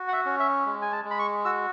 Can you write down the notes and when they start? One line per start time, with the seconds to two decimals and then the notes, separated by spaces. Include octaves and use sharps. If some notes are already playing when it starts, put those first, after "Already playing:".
Already playing: F#4
0.08 F#5
0.13 E5
0.26 C#4
0.39 E5
0.66 G#3
0.82 G#5
0.92 A5
1.05 G#3
1.10 B5
1.19 C#6
1.45 F#4 E6